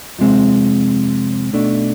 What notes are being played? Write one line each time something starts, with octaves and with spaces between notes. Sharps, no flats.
F2 C3 G#3 C4
B1 B2 A3 D4